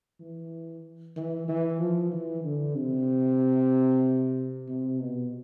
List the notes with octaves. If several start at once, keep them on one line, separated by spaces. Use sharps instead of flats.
E3
E3
E3
F3
E3
D3
C3
C3
B2